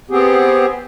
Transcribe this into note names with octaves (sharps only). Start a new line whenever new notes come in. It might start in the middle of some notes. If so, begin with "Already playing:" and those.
B3 C4 G4 G#4